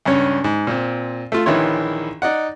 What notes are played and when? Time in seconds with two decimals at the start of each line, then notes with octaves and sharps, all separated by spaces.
0.05 C#2 G2 C#4 C#5
0.44 G#2
0.67 A#2 C4
1.32 A3 F4
1.46 A#1 D#3 E3 E4 C#5 C6
2.22 D#4 D5 F#5